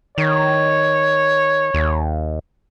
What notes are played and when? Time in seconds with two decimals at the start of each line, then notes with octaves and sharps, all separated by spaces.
0.18 D#3 C#5
1.74 D#2